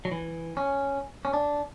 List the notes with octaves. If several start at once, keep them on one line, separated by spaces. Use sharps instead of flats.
F#3
E3
C#4
C#4
D4